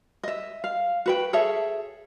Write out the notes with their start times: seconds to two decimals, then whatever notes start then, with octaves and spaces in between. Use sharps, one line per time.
0.23 D#5 E5
0.64 F5
1.06 F#4 B4 G5
1.33 G#4 A4 C#5 E5